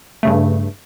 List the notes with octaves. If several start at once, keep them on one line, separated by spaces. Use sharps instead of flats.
G2 C#3 A3